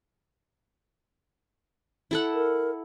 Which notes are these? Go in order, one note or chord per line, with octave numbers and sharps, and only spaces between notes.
E4 A4 F#5
A#4